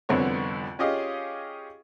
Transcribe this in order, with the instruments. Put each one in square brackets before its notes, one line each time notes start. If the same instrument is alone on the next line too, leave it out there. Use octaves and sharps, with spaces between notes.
[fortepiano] C2 F2 D3 B3 C5 C#5
C#4 F4 G4 G#4 D#5 F5